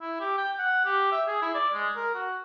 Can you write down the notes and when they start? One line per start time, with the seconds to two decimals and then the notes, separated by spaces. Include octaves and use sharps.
0.01 E4
0.20 G4
0.38 G5
0.59 F#5
0.85 G4
1.12 E5
1.27 G#4
1.42 E4
1.54 D5
1.74 G#3
1.96 A#4
2.14 F#4